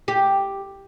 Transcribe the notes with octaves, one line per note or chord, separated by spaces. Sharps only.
G4